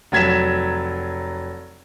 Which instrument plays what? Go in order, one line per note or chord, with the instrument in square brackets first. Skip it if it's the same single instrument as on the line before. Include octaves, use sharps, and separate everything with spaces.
[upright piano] F1 F#3 G#6 B6 E7